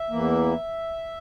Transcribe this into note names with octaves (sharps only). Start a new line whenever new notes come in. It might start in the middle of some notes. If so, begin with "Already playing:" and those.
Already playing: E5
E2 E3 A#3